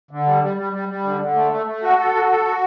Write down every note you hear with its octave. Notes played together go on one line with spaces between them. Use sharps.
D3
G3
G3
G3
G3
G3
D3
D3
A3
A3
A3
F#4
A4
F#4
A4
F#4